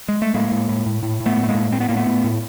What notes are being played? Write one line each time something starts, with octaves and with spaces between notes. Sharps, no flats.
G#3
A3
A2 G#3 A#3
A2
A2
A2
A2
A2
A3 B3
A2
A3
G#3 A#3
A2
A2 C4
B3
A2 A#3
A3 B3
A2
A2